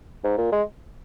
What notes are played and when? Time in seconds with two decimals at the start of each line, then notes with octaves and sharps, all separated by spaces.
0.24 G#2
0.38 A#2
0.52 G#3